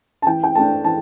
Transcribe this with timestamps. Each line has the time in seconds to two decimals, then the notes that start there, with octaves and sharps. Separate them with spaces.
0.22 A5
0.27 E3 G5
0.44 G5
0.55 A3 D4 A5
0.84 E3 A5